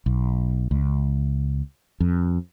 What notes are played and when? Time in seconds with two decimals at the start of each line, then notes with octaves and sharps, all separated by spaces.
0.06 B1
0.71 C#2
2.00 F2